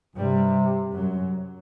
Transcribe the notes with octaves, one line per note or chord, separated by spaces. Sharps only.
G2 C3 G3
F#2 F#3